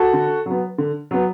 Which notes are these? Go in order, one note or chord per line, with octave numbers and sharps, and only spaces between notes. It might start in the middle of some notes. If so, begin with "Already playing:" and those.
Already playing: F#4 A4
D3
F#3 B3
D3
F#3 B3